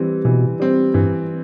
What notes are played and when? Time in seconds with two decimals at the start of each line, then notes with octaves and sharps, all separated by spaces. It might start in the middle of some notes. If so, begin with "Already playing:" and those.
Already playing: E3 G3 C4
0.25 B2 E3
0.60 G3 C4
0.94 G2 E3